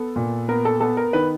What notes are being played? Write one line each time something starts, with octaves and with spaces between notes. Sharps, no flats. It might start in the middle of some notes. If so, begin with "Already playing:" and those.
Already playing: B3 A4
A#2
B3 A#4
A4
B3 A4
A#4
D#3 B4